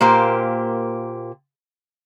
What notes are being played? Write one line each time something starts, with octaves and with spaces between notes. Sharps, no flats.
A#2 A#3 G4 C5